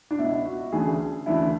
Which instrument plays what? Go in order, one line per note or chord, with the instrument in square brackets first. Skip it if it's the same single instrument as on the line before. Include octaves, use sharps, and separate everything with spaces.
[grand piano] D4
[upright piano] C#2 B2 F#3 B3 F#4 [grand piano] E4
[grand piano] F#4
[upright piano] D2 C#3 E3 A3 D4 [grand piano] G#4
[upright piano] D2 C#3 E3 A3 D4 [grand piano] E4